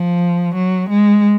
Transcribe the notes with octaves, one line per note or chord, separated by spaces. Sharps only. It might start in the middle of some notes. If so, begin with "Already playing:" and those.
Already playing: F3
F#3
G#3